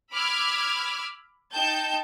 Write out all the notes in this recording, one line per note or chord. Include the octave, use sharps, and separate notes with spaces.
B5 D6 E6 F6 G#6
D#4 G5 A5 G6